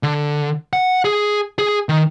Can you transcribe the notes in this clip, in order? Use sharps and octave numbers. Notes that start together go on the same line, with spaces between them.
D3
F#5
G#4
G#4
D#3